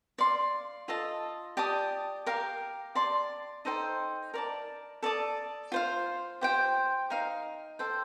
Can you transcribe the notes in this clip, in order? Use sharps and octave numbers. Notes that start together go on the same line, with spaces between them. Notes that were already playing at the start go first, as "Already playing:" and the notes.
D5 F5 C6
F4 A4 D#5 A5
G4 D5 A5 D#6
G4 A#4 F5
D5 A5 C6
D#4 A4 C5 G5
A#4 D5 A5
A4 D5 A5 D#6
F4 C5 F5
G4 C5 G5
D#4 A#4 F5
A4 C5 G5